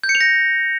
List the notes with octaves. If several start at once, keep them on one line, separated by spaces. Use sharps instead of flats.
G6
C#7
F7
A#6